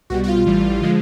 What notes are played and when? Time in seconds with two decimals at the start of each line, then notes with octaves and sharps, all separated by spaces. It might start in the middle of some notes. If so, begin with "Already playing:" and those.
0.10 C2 B2 G3 F#4
0.24 F#4
0.28 F4
0.46 A1 A2 E3 G3
0.82 D3 F3 G#3